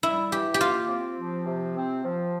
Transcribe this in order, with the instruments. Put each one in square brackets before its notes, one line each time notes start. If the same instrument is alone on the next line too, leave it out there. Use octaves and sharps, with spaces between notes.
[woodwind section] G3 [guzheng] E4
[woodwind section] E3 [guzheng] G4
[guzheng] G4
[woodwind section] A#3 [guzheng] F4
[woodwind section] C4
F3
C3
C4
F3